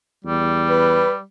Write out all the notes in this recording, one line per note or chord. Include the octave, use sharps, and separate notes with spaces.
E2 G3
B4